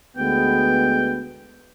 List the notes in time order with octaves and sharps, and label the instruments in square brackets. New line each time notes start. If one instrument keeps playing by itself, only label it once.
[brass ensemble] D2 G#3 B3 [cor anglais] G5